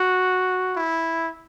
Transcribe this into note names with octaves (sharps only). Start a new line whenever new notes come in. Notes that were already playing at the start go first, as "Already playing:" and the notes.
Already playing: F#4
E4